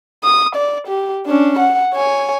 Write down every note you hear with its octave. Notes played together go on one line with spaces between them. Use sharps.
D#6
D5
G4
C#4 D4
F#5
C#5 G#5